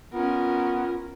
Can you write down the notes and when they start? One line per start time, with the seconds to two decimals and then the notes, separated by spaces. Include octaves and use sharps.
0.13 B3 C#4 F4 A#4